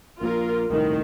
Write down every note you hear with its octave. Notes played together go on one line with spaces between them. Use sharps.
A#1 A#2 F4 A#4
D#1 C2 A2 D#3